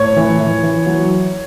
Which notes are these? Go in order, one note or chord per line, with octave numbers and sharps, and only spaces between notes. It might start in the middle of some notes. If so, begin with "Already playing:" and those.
Already playing: A2 C#5
E3
E3
E3
F#3